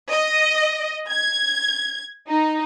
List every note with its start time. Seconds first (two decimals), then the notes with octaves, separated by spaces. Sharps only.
0.11 D#5
1.09 G#6
2.27 D#4